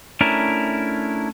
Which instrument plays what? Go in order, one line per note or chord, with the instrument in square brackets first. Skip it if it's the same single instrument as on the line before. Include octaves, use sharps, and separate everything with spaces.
[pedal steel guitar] A3 C#4 D4 E4 A#4